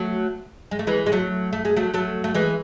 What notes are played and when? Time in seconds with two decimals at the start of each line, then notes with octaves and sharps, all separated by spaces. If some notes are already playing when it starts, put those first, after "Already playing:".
Already playing: F#3 A3
0.71 G#3
0.79 A3
0.87 E3 G#3
1.06 G#3
1.12 F#3 A3
1.53 A3
1.65 G#3
1.76 F#3 A3
1.94 F#3 A3
2.24 A3
2.34 E3 G#3